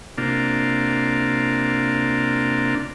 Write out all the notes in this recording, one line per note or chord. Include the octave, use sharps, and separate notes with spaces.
C3 A#3 D4 F4